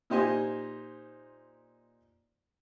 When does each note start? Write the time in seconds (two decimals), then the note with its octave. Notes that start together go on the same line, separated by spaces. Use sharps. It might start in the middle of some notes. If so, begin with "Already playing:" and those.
0.10 A#2 D#4 G4 C5 D#5 G#5